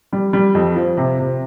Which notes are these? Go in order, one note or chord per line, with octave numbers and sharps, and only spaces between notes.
G3
G3
F2
F3
C3
C3